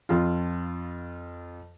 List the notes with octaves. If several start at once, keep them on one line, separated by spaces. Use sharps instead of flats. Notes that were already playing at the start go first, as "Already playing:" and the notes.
F2 F4